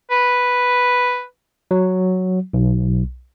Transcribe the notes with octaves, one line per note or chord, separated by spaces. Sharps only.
B4
F#3
B1